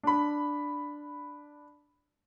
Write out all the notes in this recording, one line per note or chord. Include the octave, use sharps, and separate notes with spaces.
D4 B5